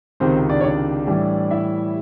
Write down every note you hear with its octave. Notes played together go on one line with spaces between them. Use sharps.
C#2 C3 D#3 C4 C5
D4 D5
C#5
D4 D5
A2 E3 G3
E4 E5